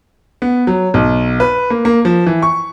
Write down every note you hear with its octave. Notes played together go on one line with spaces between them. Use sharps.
B3
F#3
B1
B4
A#3
A#3
F3
E3
C#6